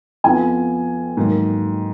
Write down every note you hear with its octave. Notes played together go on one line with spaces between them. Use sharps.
F2 F3 B3 G#5
G#2 D#3 F#3 A#3